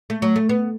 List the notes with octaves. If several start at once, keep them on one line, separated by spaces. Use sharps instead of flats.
A3
F#3
A3
B3